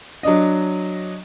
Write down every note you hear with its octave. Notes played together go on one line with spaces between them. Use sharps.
F#3 D4 D#5